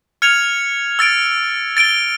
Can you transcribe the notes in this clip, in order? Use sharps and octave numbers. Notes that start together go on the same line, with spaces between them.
F6 G#6 C#7 F7
E6 A6 D7
A6 D7 G7